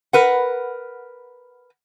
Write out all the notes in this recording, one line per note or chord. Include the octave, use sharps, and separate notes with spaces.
A#4 B4 F#5